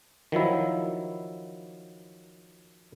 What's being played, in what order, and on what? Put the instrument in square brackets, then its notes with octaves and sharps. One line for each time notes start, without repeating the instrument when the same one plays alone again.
[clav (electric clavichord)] D#3 F3 F#3 E4